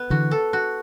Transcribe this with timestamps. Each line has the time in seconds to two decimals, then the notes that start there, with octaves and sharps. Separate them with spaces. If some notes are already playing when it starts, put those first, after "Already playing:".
Already playing: B3
0.10 D3 E3 F#4
0.31 A4
0.53 F#4